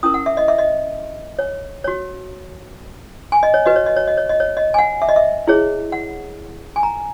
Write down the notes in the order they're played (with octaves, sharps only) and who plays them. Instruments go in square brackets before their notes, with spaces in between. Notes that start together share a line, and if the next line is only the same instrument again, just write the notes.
[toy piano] C#4 E4 A#4 D#6
F#5
E5
D#5
E5
D#5
C#5
F#4 C#5
G#5
D#5
C#5
F#4 B4 D#5
C#5
D#5
C#5
D#5
C#5
D#5
C#5
D#5
G#5
F#5
E5
D#5
E5
E4 G#4 C#5
F#5
G#5
A#5